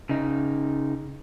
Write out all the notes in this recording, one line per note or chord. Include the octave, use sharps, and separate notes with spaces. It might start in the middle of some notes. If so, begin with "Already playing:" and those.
C#3 D#4